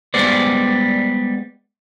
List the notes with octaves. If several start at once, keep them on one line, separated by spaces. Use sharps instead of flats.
G3 G#3 B3 C5 D5